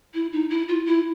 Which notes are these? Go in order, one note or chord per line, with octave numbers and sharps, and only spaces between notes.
E4
D#4
E4
F4
E4